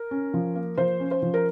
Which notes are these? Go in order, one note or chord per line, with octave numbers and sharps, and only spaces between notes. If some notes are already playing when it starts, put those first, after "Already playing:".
Already playing: A#4
C#4
F3
A#3
F3 C5
C#4
C5
F3
A#4